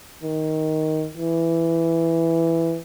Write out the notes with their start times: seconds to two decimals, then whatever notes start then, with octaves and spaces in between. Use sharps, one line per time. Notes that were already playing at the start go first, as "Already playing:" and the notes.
0.23 D#3
1.14 E3